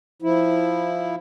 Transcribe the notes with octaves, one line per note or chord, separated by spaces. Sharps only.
F3 E4